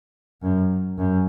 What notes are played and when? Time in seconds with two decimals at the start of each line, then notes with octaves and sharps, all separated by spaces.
0.42 F#2
0.98 F#2